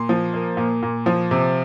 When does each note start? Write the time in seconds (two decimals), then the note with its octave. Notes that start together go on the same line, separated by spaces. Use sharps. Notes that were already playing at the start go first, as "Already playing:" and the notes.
Already playing: A#2 C6
0.09 F3
0.34 A#3
0.57 A#2
0.83 A#2
1.06 F3
1.31 C3